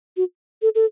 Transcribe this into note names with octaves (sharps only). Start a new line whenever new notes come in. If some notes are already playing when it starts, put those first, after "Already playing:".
F#4
A4
A4